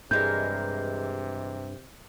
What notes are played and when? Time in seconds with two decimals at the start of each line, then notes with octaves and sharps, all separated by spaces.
0.11 G2 C3 E3 G#3 A#4 G6